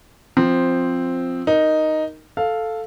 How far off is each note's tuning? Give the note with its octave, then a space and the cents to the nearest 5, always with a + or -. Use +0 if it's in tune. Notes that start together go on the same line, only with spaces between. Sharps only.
F3 +5 C4 +0
D#4 +0 A#4 +0
A4 +0 F5 +0